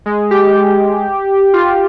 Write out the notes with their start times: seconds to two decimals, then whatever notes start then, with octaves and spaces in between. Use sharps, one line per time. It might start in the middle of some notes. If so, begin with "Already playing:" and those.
0.06 G#3
0.31 G4
1.54 F4